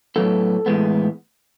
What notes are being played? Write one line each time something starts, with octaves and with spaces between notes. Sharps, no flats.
A2 F#3 B3 A4
A2 E3 G#3 B3